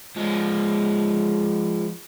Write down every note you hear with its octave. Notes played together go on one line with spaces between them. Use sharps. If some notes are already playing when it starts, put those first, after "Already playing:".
F3 G#3